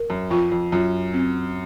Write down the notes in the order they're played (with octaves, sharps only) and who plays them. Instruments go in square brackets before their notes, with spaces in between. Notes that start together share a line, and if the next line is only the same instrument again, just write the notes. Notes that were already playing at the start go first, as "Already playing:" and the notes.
Already playing: [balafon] A#4
[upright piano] F#2
[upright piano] F2 [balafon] F4
[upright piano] F2
[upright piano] F#2 [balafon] F4
[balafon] C4